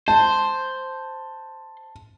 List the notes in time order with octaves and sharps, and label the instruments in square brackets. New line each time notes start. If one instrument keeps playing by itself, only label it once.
[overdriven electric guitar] C5 [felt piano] A5